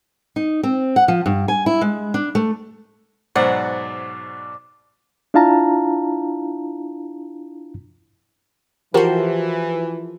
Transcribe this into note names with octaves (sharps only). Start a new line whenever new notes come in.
D#4
C4
F#5
F3
G2
G#5
E4
G#3
D4
A3
G#2 B2 F#3 C5 D5 F#5
D4 E4 F4 F5 A5 A#5
E3 F3 F#4 G4 A#4 C5